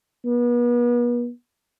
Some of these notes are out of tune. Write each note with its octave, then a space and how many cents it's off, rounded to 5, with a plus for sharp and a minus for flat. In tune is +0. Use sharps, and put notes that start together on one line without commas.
B3 -40